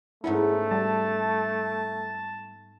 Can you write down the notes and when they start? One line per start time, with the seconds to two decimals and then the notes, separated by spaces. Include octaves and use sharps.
0.24 G#2 A3 B3 C#4 E4
0.71 G3 A5